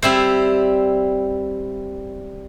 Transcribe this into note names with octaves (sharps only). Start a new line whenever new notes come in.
G3 C4 E4 C5